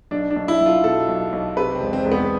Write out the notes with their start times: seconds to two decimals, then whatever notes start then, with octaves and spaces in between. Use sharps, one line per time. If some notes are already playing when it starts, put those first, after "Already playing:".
0.11 B1 D4
0.30 D4
0.36 B1
0.48 E4
0.61 B1
0.66 F4
0.84 B2 A4
1.09 B1
1.33 B1
1.57 C3 B4
1.75 C4
1.80 E1
1.93 C4
2.05 E1
2.12 B3